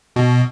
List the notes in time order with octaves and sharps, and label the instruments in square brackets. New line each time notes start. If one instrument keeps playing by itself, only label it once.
[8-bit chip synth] B2